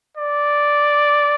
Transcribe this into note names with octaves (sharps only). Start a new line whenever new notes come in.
D5